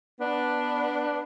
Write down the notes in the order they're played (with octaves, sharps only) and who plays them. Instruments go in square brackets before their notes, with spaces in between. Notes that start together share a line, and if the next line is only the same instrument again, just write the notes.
[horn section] B3 D4